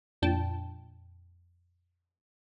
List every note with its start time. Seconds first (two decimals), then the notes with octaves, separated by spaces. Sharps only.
0.22 F2 A#2 D4 G5 A5